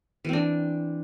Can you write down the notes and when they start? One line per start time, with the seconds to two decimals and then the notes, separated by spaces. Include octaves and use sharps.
0.25 E3
0.29 C4
0.33 D4